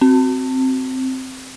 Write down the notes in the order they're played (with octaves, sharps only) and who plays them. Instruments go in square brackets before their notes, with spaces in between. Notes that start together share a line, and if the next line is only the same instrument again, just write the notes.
[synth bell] C4